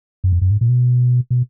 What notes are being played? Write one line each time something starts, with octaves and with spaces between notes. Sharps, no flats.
F#2
F2
F#2
G#2
A#2
B2
B2